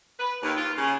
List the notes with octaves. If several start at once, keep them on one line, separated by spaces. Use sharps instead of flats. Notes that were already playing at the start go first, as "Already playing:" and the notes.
B4
D#2
F4
C#3